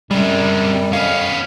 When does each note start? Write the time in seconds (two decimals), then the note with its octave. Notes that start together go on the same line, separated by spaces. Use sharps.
0.11 F#2 C3 G3 G#3
0.93 F2 B3 C#4 F5